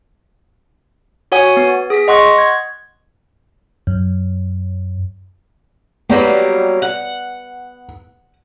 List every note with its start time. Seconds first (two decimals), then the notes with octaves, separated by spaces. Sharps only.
1.32 F#4 C#5 F#5 G#5 D#6
1.57 B3
1.90 G#4 D#6 B6
2.08 D#5 F#5 C6 C#6 D#6 F#6
2.38 G#6
3.87 F#2
6.10 F#3 G3 A#3 B3
6.82 F#5